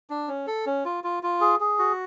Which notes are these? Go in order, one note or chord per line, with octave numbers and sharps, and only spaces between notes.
D4
C#4
A4
C#4
F4
F4
F4
G#4
G#4
F#4